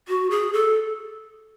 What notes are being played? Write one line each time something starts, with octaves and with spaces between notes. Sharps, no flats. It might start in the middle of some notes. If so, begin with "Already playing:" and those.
F#4
G#4
A4